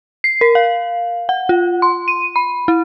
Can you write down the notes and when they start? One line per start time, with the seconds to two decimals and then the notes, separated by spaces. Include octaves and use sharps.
0.24 C7
0.41 A#4
0.55 F5
1.29 F#5
1.49 F4
1.82 C6
2.08 D#7
2.36 B5
2.68 E4